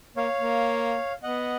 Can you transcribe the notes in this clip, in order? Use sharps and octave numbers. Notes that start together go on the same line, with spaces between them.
A#3 C#5 F5
A#3
B3 D#5 F#5